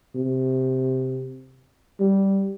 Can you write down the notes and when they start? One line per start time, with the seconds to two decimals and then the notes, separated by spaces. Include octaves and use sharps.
0.15 C3
2.00 G3